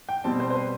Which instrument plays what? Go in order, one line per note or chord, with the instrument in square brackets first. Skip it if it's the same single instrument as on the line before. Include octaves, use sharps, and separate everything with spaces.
[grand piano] G5
B2 G3 C4 A5
C5
C5
B4